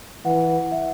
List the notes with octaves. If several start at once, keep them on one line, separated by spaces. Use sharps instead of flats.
E3 F#5
E5